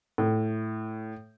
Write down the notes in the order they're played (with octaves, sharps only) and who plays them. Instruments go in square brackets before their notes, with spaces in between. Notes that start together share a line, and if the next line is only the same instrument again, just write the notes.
[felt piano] A2